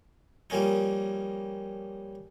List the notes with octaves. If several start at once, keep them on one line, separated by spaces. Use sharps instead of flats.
F3 G3 A#3 C#4 D#4